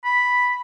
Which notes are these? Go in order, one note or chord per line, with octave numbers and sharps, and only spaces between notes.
B5